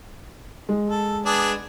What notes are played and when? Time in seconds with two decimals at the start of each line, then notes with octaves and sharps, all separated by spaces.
0.69 G#3
0.90 A4
1.25 B3 D4 G#4